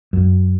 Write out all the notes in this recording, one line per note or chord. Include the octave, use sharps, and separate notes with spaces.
F#2